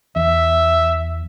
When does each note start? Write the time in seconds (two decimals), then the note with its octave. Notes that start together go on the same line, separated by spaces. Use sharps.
0.16 E2 E5